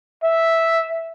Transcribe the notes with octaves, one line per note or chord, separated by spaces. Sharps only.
E5